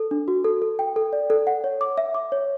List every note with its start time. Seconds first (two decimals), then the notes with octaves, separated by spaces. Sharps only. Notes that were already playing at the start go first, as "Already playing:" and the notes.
Already playing: A4
0.11 D4
0.28 F#4
0.44 A4
0.62 A4
0.79 G5
0.96 A4
1.13 D5
1.30 A4
1.47 F#5
1.64 C#5
1.81 D6
1.98 E5
2.14 D6
2.32 C#5